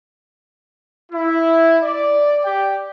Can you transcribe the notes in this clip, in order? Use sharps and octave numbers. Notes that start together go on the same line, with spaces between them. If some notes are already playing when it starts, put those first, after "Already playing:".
E4
D5
G4 D5 G5